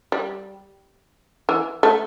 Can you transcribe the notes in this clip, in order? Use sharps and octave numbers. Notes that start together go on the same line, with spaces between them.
G3
E3
A3